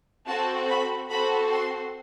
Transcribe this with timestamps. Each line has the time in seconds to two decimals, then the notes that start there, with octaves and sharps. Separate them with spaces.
0.27 C4 F#4 A4 A5
0.68 B5
1.10 C4 F#4 A4 B5
1.51 C6